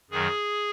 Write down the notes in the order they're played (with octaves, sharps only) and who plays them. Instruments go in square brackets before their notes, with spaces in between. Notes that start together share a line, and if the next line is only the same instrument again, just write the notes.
[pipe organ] F#2 D#3 F#3 G#4